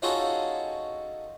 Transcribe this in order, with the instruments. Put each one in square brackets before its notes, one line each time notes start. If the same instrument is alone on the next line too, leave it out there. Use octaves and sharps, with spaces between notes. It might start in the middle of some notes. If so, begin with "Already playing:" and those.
[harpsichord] C#4 D#4 F4 F#4 G#4 A4